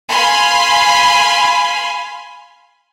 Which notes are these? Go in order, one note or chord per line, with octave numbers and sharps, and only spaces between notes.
F5 G#5 B5 C6